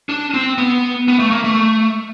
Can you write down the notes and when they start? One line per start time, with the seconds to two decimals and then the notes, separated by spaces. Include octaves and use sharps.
0.09 D4
0.34 C4
0.58 B3
1.08 B3
1.20 A3
1.31 A#3
1.44 A3